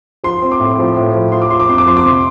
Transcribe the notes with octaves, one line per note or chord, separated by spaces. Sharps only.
F3 C6
C4
D6
A2
F3
A2
F3
F3 C6
D6
F3 C6
D6
F2 C6
D6
F3 C6
D6
C3 C6